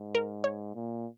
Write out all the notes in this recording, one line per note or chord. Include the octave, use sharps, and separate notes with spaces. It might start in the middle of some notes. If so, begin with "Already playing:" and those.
Already playing: G#2
A#4
C#5
A#2